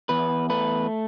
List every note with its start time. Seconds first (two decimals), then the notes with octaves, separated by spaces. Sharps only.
0.09 E2 B4
0.50 A3 B4